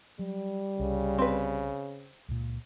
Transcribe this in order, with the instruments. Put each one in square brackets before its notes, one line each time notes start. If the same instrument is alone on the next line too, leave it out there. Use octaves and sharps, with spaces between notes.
[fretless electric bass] F#3 [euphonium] G3
[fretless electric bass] C2 [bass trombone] C#3
[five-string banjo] C4 B4
[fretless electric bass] C#2 A#2